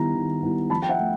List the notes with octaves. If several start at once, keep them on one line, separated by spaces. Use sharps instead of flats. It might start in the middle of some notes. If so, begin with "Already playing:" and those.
Already playing: D#3 G3 B3 E4 A#5
D#3
G3 B3 E4
F3 A5 B5
G5
E5 F#5
A3